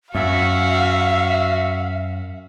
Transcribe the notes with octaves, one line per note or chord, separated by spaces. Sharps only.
F#2 F#4 E5 F5